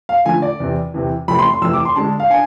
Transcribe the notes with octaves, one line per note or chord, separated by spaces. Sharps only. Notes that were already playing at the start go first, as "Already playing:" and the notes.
F5
D3 F3 A3 G#5
D5
E2 C3 E3
E2 C3 E3
F2 C3 E3 A3 B5
C6
C6
F2 C3 E3 A3 E6
D6
C6
D3 G#3 D4 A5
F5
D4 G#5